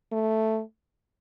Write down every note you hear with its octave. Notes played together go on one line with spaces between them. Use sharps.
A3